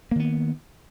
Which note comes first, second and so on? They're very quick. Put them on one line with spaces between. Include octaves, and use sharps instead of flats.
A#3 D#3 B3